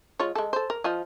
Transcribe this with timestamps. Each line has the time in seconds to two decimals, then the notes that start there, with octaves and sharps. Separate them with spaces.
0.19 G#3 F4 C#5
0.35 G#3 A4
0.53 A4 C5
0.70 A#4
0.84 F3 F4 D#5